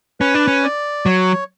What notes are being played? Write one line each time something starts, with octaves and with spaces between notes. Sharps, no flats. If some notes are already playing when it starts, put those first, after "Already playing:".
C#4 B4
D4
C#4
D5
F#3 C#5